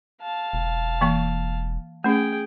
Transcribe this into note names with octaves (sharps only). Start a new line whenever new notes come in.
F5 A5
E1
E3 A#3 C#6
A3 C#4 G#4 G5